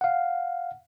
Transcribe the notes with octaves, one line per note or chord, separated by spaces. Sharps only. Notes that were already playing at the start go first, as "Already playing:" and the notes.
F5 F#5